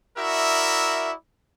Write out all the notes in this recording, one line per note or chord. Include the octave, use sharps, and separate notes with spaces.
E4 F#4 A#4 D5 E5